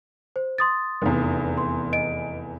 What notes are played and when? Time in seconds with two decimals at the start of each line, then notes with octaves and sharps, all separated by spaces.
0.36 C5
0.58 C6 D#6 A6
1.02 F1 E2
1.57 C6
1.93 D#5 D7